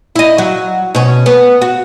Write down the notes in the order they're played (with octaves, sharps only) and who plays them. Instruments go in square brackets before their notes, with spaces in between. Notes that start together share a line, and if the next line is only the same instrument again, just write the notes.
[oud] E4 D#5
F#3
B2 C#4
B3
F#4